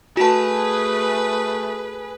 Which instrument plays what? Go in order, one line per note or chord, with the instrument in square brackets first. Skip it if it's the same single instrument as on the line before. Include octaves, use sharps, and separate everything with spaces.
[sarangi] A3 [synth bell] F#4 A5 [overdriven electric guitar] G#4 [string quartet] B4